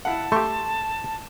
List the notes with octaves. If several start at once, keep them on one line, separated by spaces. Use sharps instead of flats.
E4 F5 F#5 A5
A3 G4 C6 C#6 E6